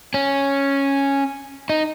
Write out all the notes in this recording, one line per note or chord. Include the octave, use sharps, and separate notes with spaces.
C#4
D#4